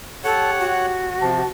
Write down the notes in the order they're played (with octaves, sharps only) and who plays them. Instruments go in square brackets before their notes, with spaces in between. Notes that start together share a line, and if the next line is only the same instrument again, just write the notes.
[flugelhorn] G4 [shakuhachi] A4 [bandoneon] C#5 F#5
[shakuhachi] F#4
[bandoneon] C3 F3 [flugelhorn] A5